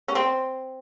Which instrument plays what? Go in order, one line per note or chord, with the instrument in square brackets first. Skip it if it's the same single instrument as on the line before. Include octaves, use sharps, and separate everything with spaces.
[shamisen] C#4
C4